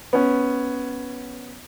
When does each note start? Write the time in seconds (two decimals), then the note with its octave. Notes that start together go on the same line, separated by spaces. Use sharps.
0.13 B3 C#4